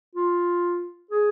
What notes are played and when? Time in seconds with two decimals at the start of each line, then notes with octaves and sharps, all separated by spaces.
0.16 F4
1.11 G#4